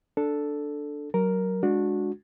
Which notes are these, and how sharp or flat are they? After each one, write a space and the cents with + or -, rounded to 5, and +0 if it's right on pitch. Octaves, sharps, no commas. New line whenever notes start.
D4 +0 A4 +0
F#3 +20 A#4 +0
G#3 +0 D4 +0 F#4 -20